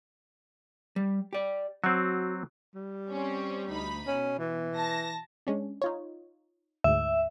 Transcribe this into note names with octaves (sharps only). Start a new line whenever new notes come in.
G3
G4 D5
F#3 C4 F#4
G3
C4 C#4
D2 D#4 B5
B2 C#4
E3
A5 A#6
G#3 C#4 D4
D#4 F4 C#5
D2 G#2 E5